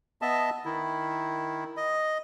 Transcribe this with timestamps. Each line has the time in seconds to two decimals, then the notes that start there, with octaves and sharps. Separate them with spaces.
0.22 B3 D#5 E5 A5
0.65 D#3 E4
1.77 D#5